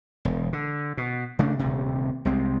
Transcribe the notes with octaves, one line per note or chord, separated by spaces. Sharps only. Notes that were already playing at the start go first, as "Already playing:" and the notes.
E1
D3
B2
C#3 A3 D4
D#1 D2 C3
C2 C3 G#3 C4